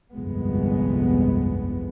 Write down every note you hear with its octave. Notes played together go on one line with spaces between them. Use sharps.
G1 C2 F2 G#3 B3